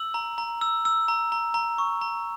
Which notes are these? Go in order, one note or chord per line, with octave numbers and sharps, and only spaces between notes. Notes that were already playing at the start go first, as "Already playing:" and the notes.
Already playing: E6 F#7
A#5
A#5
E6
E6
A#5
A#5
A#5
C#6
A#5